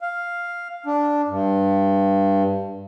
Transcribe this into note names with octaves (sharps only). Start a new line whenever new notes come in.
F5
D4
G2